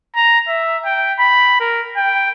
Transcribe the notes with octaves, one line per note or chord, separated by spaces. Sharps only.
A#5
E5
G5
B5
A#4
G5